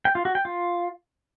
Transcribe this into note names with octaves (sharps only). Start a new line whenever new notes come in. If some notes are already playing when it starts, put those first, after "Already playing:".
G5
F4
F#4
G5
F4